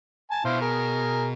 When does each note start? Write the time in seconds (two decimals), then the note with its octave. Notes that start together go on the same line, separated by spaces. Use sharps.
0.31 G#5 A5
0.45 B2 E4 C5 F5
0.61 G#4 A#4